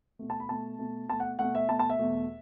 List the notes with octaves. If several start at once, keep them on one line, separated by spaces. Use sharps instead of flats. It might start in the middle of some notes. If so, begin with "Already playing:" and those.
B2 A3
A5
B5
B2 A3 A5
B2 A3
B2 A3 A5
F#5
B2 A3 F#5
E5
B2 A3 A5
A5
E5
E2 B2 A3